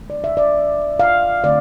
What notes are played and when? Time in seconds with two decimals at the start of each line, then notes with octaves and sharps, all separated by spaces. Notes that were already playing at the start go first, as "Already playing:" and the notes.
Already playing: D3 G#3 B3
0.10 D5
0.24 E5
0.37 D5
0.99 F5
1.44 D3 A3 C4 D5